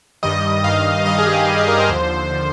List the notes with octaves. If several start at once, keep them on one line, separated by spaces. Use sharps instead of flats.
G2 D#3 G3 D#5
G2 D#3 G3 F5
G2 D#3 G3 D#5
G#4
G4
G2 D#3 G3
G#4
A#4
C5
D#2 D3 F3
D3 F3